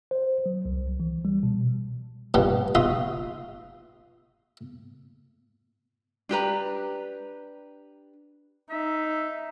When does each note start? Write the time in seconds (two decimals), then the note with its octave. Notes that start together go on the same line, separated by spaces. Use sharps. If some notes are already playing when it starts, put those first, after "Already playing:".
0.11 C5
0.46 F#3
0.65 C2
1.00 E3
1.25 G3
1.43 B2
2.34 G2 B2 F3 B3 D#4 G4
2.75 D#4 F4 F#4 E5 C6 D#6
6.29 D4 G4 B4 A#5
8.70 D#4 E5